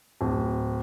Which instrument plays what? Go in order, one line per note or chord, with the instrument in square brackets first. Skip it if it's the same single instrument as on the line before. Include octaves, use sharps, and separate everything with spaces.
[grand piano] D1